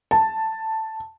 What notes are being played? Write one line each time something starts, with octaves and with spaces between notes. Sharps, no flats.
A5